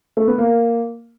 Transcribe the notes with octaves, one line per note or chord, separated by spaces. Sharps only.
A3
B3
A#3